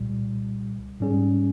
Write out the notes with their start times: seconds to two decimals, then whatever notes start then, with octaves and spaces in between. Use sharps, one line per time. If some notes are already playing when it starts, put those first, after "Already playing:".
Already playing: C2 A#2 G3
1.00 G#2 G3 C#4 G#4